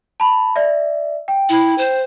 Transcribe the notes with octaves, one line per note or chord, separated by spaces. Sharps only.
A5 B5
D5 E5
G5
E4
C5